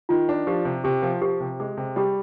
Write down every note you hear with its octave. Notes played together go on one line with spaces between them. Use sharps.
D#3 F4
D4
F3 G4
C3
C3 G4
F3
F3 G4
C3
G#3 G#4
C3
G3 G4